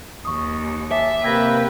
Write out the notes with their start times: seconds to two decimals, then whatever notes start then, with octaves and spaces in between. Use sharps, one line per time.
0.25 D#2 C#6 D#6
0.91 C#5 E5 G#5 A5 D6
1.23 C3 A#3 B4 G5 E6 G#6 A#6